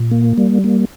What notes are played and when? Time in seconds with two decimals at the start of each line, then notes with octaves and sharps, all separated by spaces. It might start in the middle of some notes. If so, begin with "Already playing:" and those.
Already playing: A#2
0.11 A#3
0.38 G3
0.64 A#3